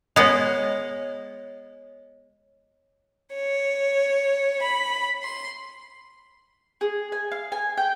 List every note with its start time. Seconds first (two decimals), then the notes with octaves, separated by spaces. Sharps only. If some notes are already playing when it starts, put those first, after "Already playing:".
0.16 G#3 B3 C#5 D#5
3.35 C#5
4.63 B5
5.23 C6
6.81 G#4
7.12 G#5
7.31 F5
7.52 G#5
7.78 G5